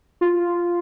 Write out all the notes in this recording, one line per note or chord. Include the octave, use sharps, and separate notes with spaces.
F4